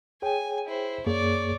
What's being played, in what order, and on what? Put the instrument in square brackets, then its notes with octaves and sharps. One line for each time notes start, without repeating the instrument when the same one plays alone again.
[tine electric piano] G#4 C#5 G5 [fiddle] G#5
[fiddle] E4 C5
[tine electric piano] F#2 A#3 G#4 [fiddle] C#5 D5